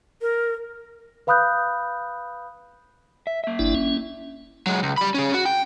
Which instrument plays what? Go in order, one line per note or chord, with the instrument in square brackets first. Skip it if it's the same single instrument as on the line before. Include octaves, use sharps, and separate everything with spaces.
[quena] A#4
[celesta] B4 F5 B5 D#6 F#6 G6
[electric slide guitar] E5
A#3 E5
[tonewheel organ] G1 D4 E4
C#4
[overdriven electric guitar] F#3 G#3
C#2
G3 B5
C#4 G#4
F#4
G5